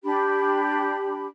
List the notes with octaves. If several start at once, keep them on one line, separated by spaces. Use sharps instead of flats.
D4 G4 B5